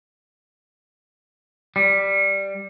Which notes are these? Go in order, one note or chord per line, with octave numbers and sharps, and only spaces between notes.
G3